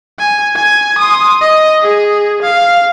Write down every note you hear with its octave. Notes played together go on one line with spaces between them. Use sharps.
G#5
G#5
C6 D#6
D#5
G#4
F5